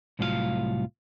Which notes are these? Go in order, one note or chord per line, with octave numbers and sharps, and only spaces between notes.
C2 A2 F#3 F4 F#4 F5